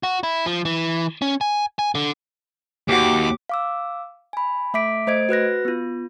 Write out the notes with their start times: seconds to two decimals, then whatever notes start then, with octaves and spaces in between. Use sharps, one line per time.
0.03 F#4
0.23 E4
0.46 F3
0.65 E3
1.22 C#4
1.41 G#5
1.79 G#5
1.95 D3
2.89 D#2 F#4 G4 D6
3.49 F5 D6 E6
4.33 G#5 B5
4.74 A3 E5 D6 B6 D7
5.07 A3 C5 D#5 G#6 D7
5.29 F#4 B4 F#6 A#6
5.65 B3 F4